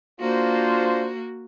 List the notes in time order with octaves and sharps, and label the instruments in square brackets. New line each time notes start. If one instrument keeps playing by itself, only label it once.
[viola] A#3 F#4 [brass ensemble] D4 F4 C5